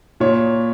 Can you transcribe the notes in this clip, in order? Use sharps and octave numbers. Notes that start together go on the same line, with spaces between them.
A#2 C#5